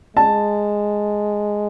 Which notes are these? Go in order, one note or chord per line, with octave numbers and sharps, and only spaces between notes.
G#3 A5